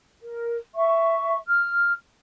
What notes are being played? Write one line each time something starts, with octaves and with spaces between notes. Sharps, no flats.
A#4
E5 C#6
F6